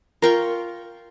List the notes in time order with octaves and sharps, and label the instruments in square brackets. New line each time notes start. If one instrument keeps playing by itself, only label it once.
[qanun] F4 G5 C#6 [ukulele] A#4